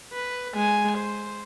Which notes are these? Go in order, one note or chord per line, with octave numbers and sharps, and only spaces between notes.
B4
G#3 G#5
C5